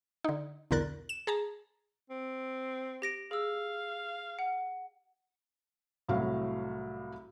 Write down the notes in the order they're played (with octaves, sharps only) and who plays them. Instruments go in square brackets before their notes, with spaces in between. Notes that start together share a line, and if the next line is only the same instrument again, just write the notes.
[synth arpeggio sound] D3 D#4
B1 E2 D3 A#4 F#6 A6
E7
G#4 A5 A#5
[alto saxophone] C4
[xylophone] G4 A#6 D7
[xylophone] G#4 E6 [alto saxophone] F5
[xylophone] F#5
[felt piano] C2 A2 F#3 F5